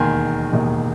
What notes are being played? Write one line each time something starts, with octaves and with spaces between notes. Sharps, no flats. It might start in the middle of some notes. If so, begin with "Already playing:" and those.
Already playing: E1 D#2 D#3 G#5 C6
E1 D#2 D#3